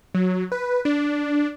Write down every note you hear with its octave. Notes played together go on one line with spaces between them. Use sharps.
F#3
B4
D4